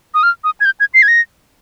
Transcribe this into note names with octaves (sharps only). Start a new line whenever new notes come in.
D#6
F6
D#6
G#6
G6
G#6
C7
G#6
A#6